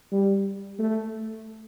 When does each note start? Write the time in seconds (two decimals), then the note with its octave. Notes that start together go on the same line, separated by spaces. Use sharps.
0.12 G3
0.79 A3